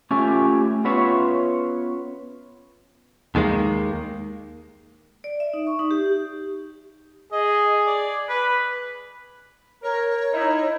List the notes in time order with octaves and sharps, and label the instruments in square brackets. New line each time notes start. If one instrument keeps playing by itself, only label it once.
[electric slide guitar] A3 C#4 F4 G4 E5 G#5
B3 C#4 F4 B4 C#5 E5
[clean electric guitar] D#2 D#3 G#3 A#3
[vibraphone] D5
E5
D#4
C#6
D#4
G4
[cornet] G#4 [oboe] D#5
[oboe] D5
B4
[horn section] A#4 [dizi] C#5
[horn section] D#4 E4